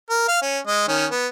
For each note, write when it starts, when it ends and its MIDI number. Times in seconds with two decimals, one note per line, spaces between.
0.10 0.25 70
0.28 0.40 77
0.42 0.59 61
0.67 0.84 56
0.67 0.84 75
0.88 1.06 51
0.88 1.06 61
1.11 1.27 59